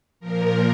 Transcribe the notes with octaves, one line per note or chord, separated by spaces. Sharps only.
A#2 F3 A#4